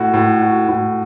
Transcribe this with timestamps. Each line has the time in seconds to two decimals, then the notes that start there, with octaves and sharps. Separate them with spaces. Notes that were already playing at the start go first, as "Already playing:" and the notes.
Already playing: A2 F#4
0.13 A2
0.41 F#4
0.69 A2